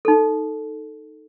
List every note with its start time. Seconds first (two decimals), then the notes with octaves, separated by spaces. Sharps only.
0.05 D#4 A4